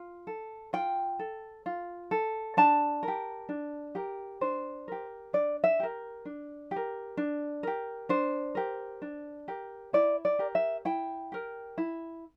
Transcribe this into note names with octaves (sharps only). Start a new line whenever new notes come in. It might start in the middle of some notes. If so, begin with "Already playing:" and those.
Already playing: F4
A4
F4 G5
A4
F4
A4
D4 A5
A#4
G4
D4
G4 A#4
D4 C5
G4 A#4
D4 D5
E5
G4 A#4
D4
G4
A#4
D4
G4 A#4
D4 C5
G4 A#4
D4
G4 A#4
E4 D5
D5
G4 A#4
E5
E4 G5
G4 A#4
E4